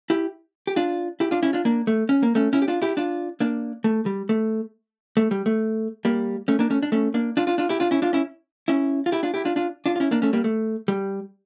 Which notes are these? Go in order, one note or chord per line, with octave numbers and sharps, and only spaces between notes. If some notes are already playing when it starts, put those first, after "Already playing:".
E4 G4
G4
D4 F4
E4 G4
D4 F4
C#4 E4
D4 F4
A#3 D4
A3
C#4
A#3
A3 C#4
C#4 E4
G4
D4 F4
E4 G4
D4 F4
A#3 D4
A3
G3
A3
A3
G3
A3
G3 A#3
A3 C#4
A#3 D4
A3 C#4
D4
A3 C#4
A#3 D4
D4 F4
D4 F4
D4 F4
E4 G4
D4 F4
C#4 E4
D4 F4
C#4 E4
C#4 E4
F4
E4 G4
D4 F4
E4 G4
D4 F4
D4 F4
D4 F4
F4
C#4 E4
A#3 D4
A3 C#4
G3 A#3
A3
G3